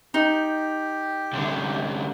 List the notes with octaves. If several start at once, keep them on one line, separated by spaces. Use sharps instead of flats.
D#4 G4
C2 D3